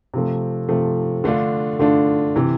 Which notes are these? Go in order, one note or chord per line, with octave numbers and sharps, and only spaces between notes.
C3 F3 A3
C3 F3 A3
D3 A3 D4 F4
D3 A3 D4 F4
C3 E3